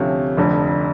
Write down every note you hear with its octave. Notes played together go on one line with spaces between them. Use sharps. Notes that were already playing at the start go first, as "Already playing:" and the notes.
Already playing: D2 C3 F3 A3 C#4
F1 F2 D3